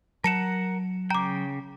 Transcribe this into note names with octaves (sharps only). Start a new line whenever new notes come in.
F#3 A#4 F#5 A5 C#7 E7
C#3 G5 A#5 D6